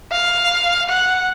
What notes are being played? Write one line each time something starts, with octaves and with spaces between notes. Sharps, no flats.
F5
F#5